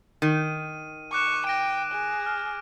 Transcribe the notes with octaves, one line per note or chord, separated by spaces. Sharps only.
D#3 D#7
C#6 D6 F#6 E7
G5 A#6 D7
G#4
F6